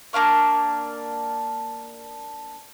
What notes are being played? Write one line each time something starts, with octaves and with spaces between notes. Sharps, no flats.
A#3 D4 F5 C#6